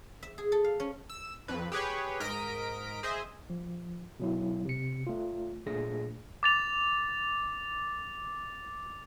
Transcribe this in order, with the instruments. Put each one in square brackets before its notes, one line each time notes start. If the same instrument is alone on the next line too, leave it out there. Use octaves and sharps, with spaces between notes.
[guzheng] E5
G#4
A4
F5
C#4
[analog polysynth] E6
F2 B4
G4 G#4 B4 C#5
G#2 A#4 D#5 A#6 B6 D7
G#4 C5 D#5 E5
[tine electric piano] F3
B2 F#3 E4
C3 C#7
A3 F4
A#2 A3 D4 G#4 A#6
[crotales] D6 A6 F7